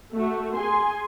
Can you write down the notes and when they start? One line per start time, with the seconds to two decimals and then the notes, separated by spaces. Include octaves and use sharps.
0.12 A3 F#4
0.54 G#4 G#5 C6